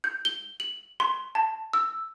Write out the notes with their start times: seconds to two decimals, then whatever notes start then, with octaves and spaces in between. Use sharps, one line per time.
0.04 G6
0.25 G7
0.60 F#7
1.00 C6
1.35 A5
1.73 E6